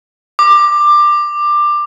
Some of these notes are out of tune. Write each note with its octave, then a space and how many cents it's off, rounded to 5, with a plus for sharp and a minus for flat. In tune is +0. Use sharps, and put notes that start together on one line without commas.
D6 +15